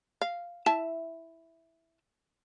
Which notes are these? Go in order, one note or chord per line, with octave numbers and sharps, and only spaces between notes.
F5
E4 E5 A5